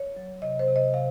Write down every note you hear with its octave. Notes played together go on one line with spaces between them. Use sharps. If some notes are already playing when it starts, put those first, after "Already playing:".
Already playing: C#5
F#3
C3 D#5
C5
C3
D#5
C3 F5